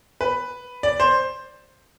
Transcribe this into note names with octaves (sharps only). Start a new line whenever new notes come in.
B4
D5
C5